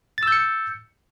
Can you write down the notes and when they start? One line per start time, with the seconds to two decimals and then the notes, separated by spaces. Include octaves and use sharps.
0.18 A6
0.23 E6
0.27 G6
0.32 C#7